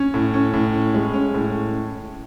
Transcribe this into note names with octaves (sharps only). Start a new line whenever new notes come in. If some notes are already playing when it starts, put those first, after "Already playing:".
Already playing: C#4
A2
C#4
A2
C#4
G#3
C#4
A2